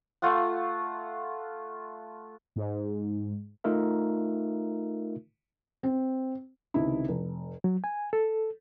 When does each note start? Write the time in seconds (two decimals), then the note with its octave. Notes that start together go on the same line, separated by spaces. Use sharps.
0.22 A3 F4 F5 F#5
2.56 G#2
3.64 A3 D#4 F4 A#4 E5
5.83 C4
6.74 C#2 C3 D#3 D#4 E4
7.09 F1
7.64 F#3
7.84 G#5
8.13 A4